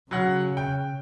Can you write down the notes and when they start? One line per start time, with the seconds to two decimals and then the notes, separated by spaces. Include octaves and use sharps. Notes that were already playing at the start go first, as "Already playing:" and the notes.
0.11 C#3 F#3 F#5 F#6
0.57 G5